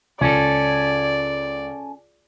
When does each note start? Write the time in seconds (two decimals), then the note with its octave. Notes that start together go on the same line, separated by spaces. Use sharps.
0.21 C#2 C#4 A4 D5